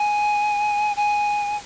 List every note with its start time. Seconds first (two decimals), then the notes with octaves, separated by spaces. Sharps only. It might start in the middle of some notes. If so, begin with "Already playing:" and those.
Already playing: G#5
0.96 G#5